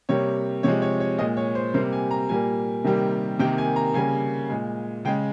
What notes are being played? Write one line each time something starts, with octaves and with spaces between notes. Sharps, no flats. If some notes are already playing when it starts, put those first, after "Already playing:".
C3 G3 A#3 C#5
C3 F3 G#3 C#5
C#5
C#5
A#2 G#3 D#5
C#5
C5
C3 G3 A#3 C5
G#5
A#5
A#2 G3 A#3 G#5
C3 D#3 G3 A#3
C3 D#3 A#3 G5
G#5
A#5
C#3 G3 A#3 G#5
A#2 G#3
C#3 G#3 G5